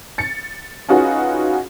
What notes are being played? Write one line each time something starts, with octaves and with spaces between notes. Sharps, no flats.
A6 C#7
C#4 D#4 F4 F#4 G#4 B4